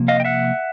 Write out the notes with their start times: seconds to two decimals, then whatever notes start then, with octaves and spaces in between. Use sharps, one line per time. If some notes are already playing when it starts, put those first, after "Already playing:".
Already playing: C3 F3 A#3
0.08 D#5 F5
0.20 G5
0.25 E5 F#5